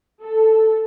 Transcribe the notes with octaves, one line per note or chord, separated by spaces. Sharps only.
A4